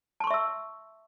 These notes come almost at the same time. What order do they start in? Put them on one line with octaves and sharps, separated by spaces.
A5 C6 C#6 E5 E6